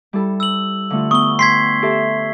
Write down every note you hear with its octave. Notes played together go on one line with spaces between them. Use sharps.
G3 E4 A4
E6 F#7
D3 A3 F4
B3 C#6 D#6 G7
G5 C6 G#6 B6 C7
G4 A4 E5